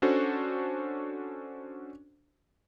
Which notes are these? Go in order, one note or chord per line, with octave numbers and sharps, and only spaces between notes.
C#4 D4 F#4 A4 C5